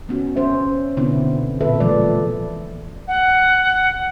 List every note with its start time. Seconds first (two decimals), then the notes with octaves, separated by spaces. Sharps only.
0.09 B3 C#4 F#4
0.36 C#4 C5 E5
0.97 B2 D3 B3 C4 E4
1.61 A#2 A4 B4 E5
1.80 E3 F3 G#3 A#3 D5
3.08 F#5